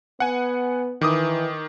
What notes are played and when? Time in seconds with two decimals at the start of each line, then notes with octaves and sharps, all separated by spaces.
0.20 B3 F#5 G#5
1.01 D#3 E3 D6 D#6